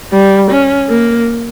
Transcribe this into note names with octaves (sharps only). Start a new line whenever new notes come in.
G3
C#4
A#3